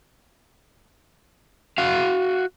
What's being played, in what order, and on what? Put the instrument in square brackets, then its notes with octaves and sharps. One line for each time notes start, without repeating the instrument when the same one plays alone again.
[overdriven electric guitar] F#4 F5